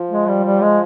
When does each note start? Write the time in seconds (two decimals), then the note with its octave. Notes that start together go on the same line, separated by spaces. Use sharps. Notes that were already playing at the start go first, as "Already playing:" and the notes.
Already playing: F3
0.11 G#3
0.27 G3
0.44 G3
0.62 G#3